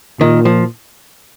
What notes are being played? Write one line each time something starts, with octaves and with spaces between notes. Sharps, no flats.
A#2 D#3
F3